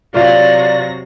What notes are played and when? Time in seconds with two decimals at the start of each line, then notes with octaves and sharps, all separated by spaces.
0.14 C3 F#3 F4 D5 F5 A#6